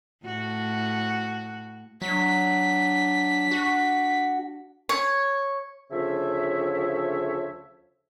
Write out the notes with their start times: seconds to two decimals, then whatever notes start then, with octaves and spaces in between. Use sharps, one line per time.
0.24 A2 F#4
2.02 F#3 D4 B6
3.51 F#4
4.89 C#5
5.91 D2 C#3 F3 C#5 E5